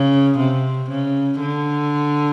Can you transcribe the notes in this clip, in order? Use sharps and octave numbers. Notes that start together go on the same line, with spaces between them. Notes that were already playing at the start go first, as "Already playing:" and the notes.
Already playing: C#3
C3
C#3
D3